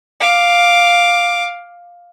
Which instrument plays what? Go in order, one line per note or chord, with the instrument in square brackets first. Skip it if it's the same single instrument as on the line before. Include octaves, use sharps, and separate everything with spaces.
[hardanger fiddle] F5 D6